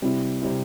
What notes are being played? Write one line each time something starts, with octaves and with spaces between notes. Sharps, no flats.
C3 G3 C4 E4
C3 G3 C4 E4